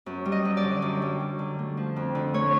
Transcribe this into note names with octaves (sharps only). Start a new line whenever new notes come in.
F#2
G3
D#5
F#2
D5
D3
F#2
G3
F#2
D3
A3
F3
F2
D3
A3 C#5